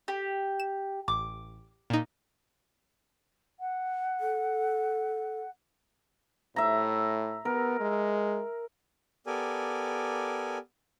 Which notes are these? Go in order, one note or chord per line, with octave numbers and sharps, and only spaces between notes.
G4
E7
A1 D6
A#2 D#4
F#5
A4
A2 E5 A#5
B3 A#4
G#3
B3 G4 A4 A#4 D5 G#5